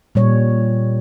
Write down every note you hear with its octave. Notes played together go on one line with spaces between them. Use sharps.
A#2 G3 C#5